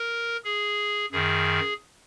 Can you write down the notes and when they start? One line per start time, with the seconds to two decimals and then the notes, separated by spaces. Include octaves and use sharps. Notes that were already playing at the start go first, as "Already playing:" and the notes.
Already playing: A#4
0.44 G#4
1.12 F#2 D#3 G#4